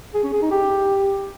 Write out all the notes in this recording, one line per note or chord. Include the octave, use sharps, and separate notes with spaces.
G#4
C#4
G#4
D#4
G4